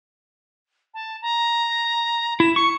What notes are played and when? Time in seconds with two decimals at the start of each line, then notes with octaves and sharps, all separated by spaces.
0.94 A5
1.22 A#5
2.40 E4 E7
2.56 C#6 C#7